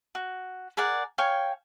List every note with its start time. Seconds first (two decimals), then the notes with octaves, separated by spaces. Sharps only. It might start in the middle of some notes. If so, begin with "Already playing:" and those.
0.15 F#4
0.77 G#4 A#4 D5 F#5
1.18 C#5 F5 G5 G#5